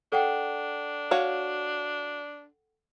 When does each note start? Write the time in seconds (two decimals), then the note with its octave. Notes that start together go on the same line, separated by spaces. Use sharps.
0.12 D4 A4 F#5 G5
1.11 F#4 C#5 F5